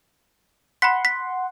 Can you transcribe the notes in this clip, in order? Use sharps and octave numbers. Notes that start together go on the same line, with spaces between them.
F#5 B5 C6 B6
B6